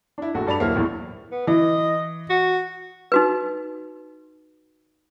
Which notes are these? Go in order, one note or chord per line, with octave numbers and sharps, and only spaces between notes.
D4 E4
A#1 A3 F#4
G2 A4 D5 A5 B5 F7
D#1 F#3 A#3 E4 C5 F6
A#1 E2 A2
B3
E3 D#5
F#4
D#4 F#4 B4